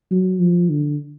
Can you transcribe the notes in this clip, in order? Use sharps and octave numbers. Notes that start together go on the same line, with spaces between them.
F#3
F3
D3